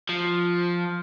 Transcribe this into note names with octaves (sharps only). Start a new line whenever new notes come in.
F3